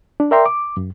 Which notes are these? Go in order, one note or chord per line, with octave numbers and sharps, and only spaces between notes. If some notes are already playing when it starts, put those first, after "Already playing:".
D4
A#4 D5 E5 G5 A#5 C6
D6
F#2